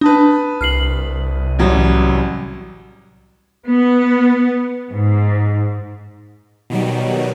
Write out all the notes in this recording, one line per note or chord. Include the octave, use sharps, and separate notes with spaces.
D4 B4 A5 D#6
C2 F6 C7 F#7
A1 F#3 G3
B3
G#2
B2 D#3 F#3 G3